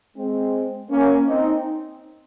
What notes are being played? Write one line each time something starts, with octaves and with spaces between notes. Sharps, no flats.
G#3 C4
A#3 C#4
C4 D#4